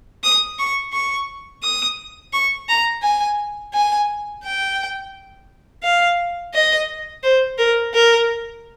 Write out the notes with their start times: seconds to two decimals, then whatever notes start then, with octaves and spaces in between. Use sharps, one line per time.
0.23 D#6
0.59 C#6
0.93 C#6
1.63 D#6
2.33 C#6
2.69 A#5
3.03 G#5
3.74 G#5
4.43 G5
5.83 F5
6.54 D#5
7.23 C5
7.58 A#4
7.94 A#4